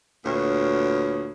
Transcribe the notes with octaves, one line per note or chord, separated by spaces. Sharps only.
D2 A#2 B3 C#5